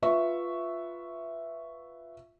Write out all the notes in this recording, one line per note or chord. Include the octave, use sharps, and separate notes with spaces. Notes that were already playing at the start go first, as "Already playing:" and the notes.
F4 B4 E5 C#6